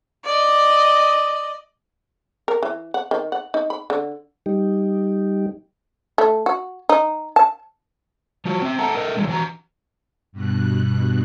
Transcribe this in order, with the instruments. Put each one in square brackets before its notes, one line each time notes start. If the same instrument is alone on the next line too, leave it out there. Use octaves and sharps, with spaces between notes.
[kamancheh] D5 D#5
[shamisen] A#4
E3
F#5
D#3
F#5
D#4
B5
D3
[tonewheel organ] G3 D#4 G4
[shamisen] A3
F#4
D#4
A5
[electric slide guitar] F3 F4 F#4
C4 E5
A4 E5 F#5 A5 A#5
A4 A#4 D#5
E3 G3 G#3
E3 F#4 G#5 A#5
[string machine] G2 B2 F#6